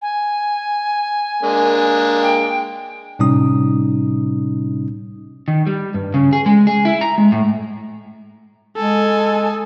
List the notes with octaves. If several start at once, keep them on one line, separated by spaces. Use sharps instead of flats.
G#5
G#3 A#3 D4
G5
A2 C3 G3 C#4 D#4 D#6
D#3
G3
G2
C#3
G#4
G#3
G#4
E4
A#5
G#3
A2
G#3 A4 G#5